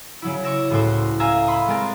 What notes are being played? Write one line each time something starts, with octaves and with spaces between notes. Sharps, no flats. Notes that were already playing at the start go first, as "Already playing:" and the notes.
C#3 F#3 E4
C#6 D6 E6 A#6
C#2 A2 F#4 C5
E5 F5 G#5 A#5 D#6 E6
B5 C6 D#6
G#3 C4 A#4 A6